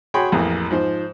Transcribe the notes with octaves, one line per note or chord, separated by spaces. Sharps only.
F#4 G#4 C#5 G5 B5 C6
A1 F2 E3 A#3 G#4
G#2 F3 C5